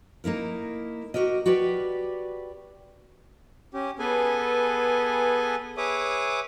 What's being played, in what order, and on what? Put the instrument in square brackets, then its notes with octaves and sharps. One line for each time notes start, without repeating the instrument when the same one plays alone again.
[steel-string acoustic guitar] A#3 D#4 E4 A#4
F#4 G4 A#4 D#5
F#4 G4 B4 D5 G5
[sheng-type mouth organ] C#4 G4
B3 G#4 A4 B4 G#5
G#4 B4 C#5 E5 D6 D#6